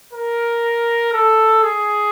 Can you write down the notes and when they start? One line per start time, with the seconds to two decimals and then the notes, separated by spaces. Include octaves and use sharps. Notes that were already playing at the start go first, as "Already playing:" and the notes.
0.13 A#4
1.13 A4
1.63 G#4